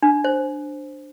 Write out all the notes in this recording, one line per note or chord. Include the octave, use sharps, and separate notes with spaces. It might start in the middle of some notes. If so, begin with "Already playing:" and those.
D4
C5